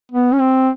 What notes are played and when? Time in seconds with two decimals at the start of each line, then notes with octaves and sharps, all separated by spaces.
0.12 B3
0.33 C#4
0.40 C4